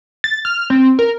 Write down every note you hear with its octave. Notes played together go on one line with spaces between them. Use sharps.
A6
F6
C4
A#4